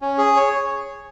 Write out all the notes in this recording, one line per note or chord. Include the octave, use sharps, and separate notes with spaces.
C#4
G#4
C#5